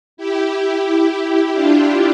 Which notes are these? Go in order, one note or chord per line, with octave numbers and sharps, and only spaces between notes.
E4 G4
E4 G4
D4 F4